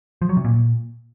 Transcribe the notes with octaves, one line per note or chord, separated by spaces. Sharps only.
F3
F#3
C3
A#2